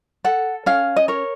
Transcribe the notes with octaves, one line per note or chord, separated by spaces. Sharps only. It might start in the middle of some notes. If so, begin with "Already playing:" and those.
A4 F#5
C#4 F5
D#5
A#4 C#5